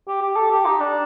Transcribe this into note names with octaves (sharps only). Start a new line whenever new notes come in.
G4
G4
A4
G4
D#4
D4